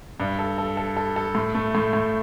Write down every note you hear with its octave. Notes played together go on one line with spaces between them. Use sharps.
G2
A4
A4
A4
A4
A4
A2
A3
A2
A2